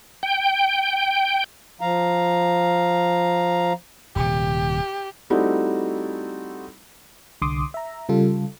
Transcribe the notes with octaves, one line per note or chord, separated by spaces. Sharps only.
G5
F3 F5 A#5
D#1 C3 G4
G3 A3 C4 D#4 E4 F#4
C2 D3 C6 D6 D#6
E5 A#5
C#3 G3 F4 A4